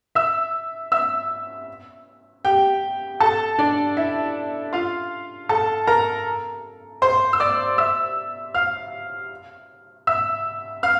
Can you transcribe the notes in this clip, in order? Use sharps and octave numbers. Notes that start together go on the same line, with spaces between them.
E5 E6
E5 E6
G4 G5
A4 A5
D4 D5
E4 E5
F4 F5
A4 A5
A#4 A#5
C5 C6
E6
D5 D6
E5 E6
F5 F6
E5 E6
F5 F6